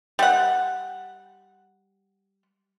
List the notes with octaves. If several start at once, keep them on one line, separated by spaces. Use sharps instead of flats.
G3 F#5